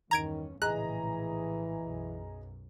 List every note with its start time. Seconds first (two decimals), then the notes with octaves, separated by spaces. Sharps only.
0.11 E2 G2 D#3 C#4 A#5 G#6 D7
0.62 A#1 A2 C#3 E3 G#4 D#5 A#5 F#6
1.82 B1 F#2 B2